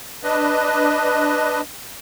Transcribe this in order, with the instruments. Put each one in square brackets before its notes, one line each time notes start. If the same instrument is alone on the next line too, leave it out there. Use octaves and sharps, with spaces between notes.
[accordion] D4 B4 D#5